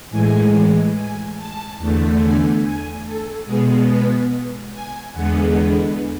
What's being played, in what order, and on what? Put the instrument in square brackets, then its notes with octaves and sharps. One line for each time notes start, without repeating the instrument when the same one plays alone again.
[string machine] A2 E3 G#3 G#5
G#5
A5
E2 D3 A3
G#5
G#5
A4
B2 G#3 B3 G#4
B4
G#5
E2 D3 G#3 B3 F#5